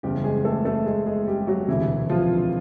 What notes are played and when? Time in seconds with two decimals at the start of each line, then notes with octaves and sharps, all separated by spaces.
0.03 F#1 E2 C#3 G3 G4
0.24 G#3 G#4
0.45 A3 A4
0.65 A3 A4
0.86 G#3 G#4
1.06 G#3 G#4
1.27 G3 G4
1.47 F#3 F#4
1.68 E1 D2 C3 E3 E4
2.10 F3 F4